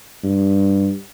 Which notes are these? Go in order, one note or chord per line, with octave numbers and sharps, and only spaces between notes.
G2